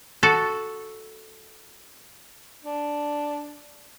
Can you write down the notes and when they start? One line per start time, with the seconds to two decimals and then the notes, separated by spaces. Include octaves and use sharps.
0.23 F#4 A4
2.63 D4